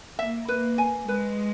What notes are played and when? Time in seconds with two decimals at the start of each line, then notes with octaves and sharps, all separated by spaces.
0.18 A#3 E5
0.48 B4
0.78 G#5
1.08 G#3 B4